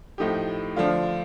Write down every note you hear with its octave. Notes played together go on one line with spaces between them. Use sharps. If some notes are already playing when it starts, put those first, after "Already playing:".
A2 F3 A3 D#4 G4
D3 F3 A3 D4 F4